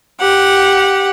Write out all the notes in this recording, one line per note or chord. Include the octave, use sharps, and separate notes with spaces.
G4 F#5